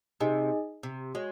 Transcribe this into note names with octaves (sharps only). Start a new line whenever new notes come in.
C3 D#4 G#4 D#5 G#5
C3
G#3 F#4 C#5